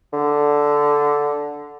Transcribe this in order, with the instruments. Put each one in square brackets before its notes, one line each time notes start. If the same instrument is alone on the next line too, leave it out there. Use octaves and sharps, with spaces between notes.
[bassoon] D3